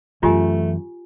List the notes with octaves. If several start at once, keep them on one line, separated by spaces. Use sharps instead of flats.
F#2 E3 A3 F4 G4 G#5